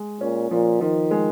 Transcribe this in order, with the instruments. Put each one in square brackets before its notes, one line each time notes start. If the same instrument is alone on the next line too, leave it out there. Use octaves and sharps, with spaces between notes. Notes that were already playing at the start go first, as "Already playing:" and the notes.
Already playing: [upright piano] G#3
[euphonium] A#2 [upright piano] C#4
[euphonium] A#2 [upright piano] F3
[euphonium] D#3 [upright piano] F3
[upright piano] G#3